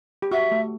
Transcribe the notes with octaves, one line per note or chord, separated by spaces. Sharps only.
G4
F#4 E5
A3